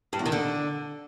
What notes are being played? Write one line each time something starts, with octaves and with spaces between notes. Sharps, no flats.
G2
E2
D#3
D3